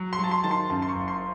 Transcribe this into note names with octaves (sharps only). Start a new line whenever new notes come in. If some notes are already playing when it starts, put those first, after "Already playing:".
Already playing: F#3
C6
F#3 A5
C6
D#3 A5
C6
F#2 A5
C6
C#6
F#1
C6